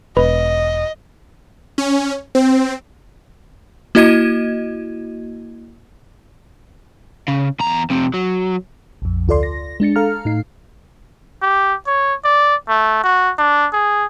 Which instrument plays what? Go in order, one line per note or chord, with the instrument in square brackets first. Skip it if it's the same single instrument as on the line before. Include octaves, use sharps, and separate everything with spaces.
[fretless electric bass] E1 [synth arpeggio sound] B4 [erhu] D#5
[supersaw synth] C#4
C4
[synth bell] A#3 E4 F#4 D#5 G#6 D#7
[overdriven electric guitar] C#3
E2 A#5
F2 C3
F#3
[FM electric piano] A#1 F2
D2 F4 A4 D5 C6
A#6
G#3 D4 A6 C#7
A4 F5 A#5 F6
A2 D#4 C7
[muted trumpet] G4
C#5
D5
A3
F#4
D4
G#4